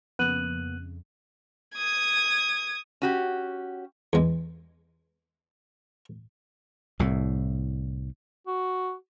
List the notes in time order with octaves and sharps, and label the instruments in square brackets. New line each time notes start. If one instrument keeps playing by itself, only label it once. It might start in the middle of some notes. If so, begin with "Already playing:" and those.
[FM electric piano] F2 C#3 [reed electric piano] A#3 B3 [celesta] F#6 D#7 F#7
[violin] D#6 G#6
[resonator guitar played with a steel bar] C#4 F#4 G4
[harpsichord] E2 G#3
[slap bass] C2 A2
[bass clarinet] F#4